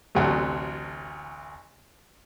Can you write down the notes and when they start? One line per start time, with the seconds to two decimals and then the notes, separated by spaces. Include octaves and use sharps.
0.15 A1 D2 C3 F#3 A3